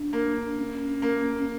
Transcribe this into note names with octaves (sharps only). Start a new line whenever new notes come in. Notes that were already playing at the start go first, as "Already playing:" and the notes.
Already playing: D4
A#3
C#4
A#3